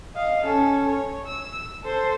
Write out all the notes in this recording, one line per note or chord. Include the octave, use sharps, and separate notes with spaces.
D#5 F5
C#4 A4
C#5
E6
A4 C5